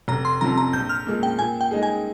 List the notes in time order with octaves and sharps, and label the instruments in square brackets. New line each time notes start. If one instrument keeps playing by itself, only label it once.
[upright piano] F1 [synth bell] A#5
[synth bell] C6
[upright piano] F2 C3 F3 [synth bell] A#5
[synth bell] A#5
[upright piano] A#1 [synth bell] G6
[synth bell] F6
[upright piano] A#2 G#3
[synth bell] G5
[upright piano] A#2 [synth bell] G#5
[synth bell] G5
[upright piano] G#3 D#4 G#4
[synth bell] G#5